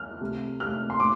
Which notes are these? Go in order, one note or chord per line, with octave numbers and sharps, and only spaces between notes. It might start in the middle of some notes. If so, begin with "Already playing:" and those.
Already playing: F6
C3 A3
C3 A3 F6
C6
A2 D6